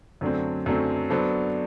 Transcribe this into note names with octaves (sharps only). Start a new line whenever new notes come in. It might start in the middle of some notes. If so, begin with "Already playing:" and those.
F#2 D3 F#3 A3 C4
F#2 D3 F#3 A3 C4
F#3 B3 D4 A4 C5